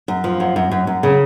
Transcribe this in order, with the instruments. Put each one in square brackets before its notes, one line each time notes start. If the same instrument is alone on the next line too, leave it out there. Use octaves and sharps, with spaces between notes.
[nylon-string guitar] F#2
F3
F#2
F#2
F#2
F#2
C#3